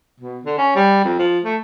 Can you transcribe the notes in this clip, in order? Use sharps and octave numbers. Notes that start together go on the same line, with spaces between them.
B2
D3
C#4
G3
F2
F3
A3